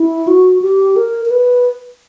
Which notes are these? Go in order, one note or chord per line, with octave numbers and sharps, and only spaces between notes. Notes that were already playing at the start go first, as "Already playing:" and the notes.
Already playing: E4
F#4
G4
A#4
A#4
B4